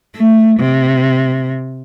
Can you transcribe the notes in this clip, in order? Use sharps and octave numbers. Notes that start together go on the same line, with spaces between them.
A3
C3